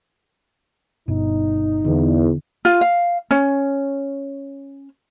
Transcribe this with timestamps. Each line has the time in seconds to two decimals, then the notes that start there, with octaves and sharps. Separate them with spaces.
1.08 G1 G2 B2 D#4
1.86 E2 D3
2.65 F4
2.81 F5
3.31 C#4